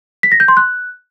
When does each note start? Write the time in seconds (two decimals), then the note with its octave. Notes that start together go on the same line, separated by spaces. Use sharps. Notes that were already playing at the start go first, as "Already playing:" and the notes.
0.23 B6
0.32 A#6
0.40 G6
0.48 C6
0.57 F#6